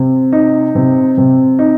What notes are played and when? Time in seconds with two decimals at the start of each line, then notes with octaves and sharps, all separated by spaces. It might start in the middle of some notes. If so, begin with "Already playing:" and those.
Already playing: C3
0.32 D#4
0.75 C3
1.18 C3
1.59 D#4